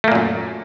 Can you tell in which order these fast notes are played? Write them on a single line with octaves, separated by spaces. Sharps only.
A3 A#3 A#2 F#2